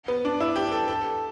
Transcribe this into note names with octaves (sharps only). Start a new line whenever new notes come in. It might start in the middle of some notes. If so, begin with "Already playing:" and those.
B3
D4
E4
G4
A4
A4